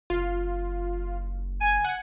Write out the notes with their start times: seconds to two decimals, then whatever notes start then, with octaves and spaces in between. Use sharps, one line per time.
0.10 F#1 F4
1.61 G#5
1.85 F#5